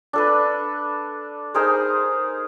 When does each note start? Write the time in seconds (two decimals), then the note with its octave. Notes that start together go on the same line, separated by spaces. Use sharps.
0.13 D4 A4 B4
1.54 D#4 G#4 A#4 C5